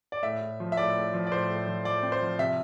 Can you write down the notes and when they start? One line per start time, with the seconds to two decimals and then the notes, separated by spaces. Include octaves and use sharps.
0.12 D5
0.23 A2 E5
0.41 A2
0.60 F3
0.72 E5
0.77 A2 D5
0.96 A2
1.14 F3
1.27 D5
1.31 A2 C5
1.50 A2
1.67 F3
1.85 F3 D5
2.03 C4
2.12 C5
2.22 F3
2.39 C3 E5